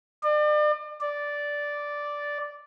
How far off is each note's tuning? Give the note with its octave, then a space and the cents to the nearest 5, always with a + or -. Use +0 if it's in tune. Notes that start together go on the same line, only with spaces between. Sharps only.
D5 +40
D5 -5